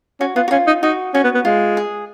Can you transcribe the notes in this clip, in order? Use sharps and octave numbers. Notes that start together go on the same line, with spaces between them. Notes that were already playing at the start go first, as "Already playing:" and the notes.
C#4 F#4
B3 F4
F#4
C#4 F4
D#4
D#4 F#4
C#4 F#4
B3
B3
G#3 F4
G#4